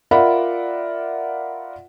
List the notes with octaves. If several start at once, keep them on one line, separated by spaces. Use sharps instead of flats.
F4 A#4 D5 E5 F#5 B5